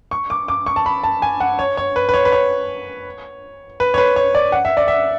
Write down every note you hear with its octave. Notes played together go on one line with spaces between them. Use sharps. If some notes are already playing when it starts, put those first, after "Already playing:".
C#6
D6
D6
C#6
A5
B5
A5
G#5
F#5
C#5
C#5
B4
B4
C#5
B4
C#5
B4
C#5
B4
C#5
D5
F#5
E5
D5
E5